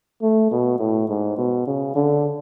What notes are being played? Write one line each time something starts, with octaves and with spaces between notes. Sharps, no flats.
A3
B2
A2
G#2
B2
C#3
D3